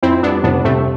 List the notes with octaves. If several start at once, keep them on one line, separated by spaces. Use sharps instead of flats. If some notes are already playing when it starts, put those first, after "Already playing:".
F2 C4 E4
G3 B3 D4
F1 B3 D4
C3 A3 C4